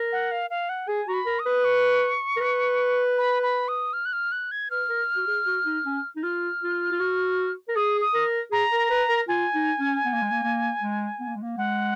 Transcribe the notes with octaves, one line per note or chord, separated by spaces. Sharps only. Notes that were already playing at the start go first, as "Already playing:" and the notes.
Already playing: A#4
F#5
F5
F5
F#5
G#4 G#5
F#4 A#5
B5
A#4
D#6
B4
C#6
A#4
B4
B5
B5
D#6
F6
F#6
F6
F#6
G#6
B4 F6
A#4
F#4
G#4
F#4
D#4
C#4
D#4
F4 F6
F4
F4
F#4
A#4
G#4 D#6
D#6
A#4
G#4 A#5
A#4
B4
A#4
F4 G#5
D#4
C#4
B3
A#3
G#3
A#3
A#3
G#3
B3
A#3
G#3
A#3
G#3 F#5